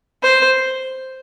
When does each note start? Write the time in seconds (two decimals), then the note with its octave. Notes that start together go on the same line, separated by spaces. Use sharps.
0.23 C5